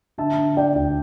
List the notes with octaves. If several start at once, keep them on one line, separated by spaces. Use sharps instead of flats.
D3 E5 A5
D3
D3 D5 G5
D2